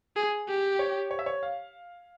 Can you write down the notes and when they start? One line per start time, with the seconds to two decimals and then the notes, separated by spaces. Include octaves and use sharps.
0.16 G#4
0.48 G4
0.79 C#5
1.11 C#5
1.19 E5
1.26 C#5
1.43 F5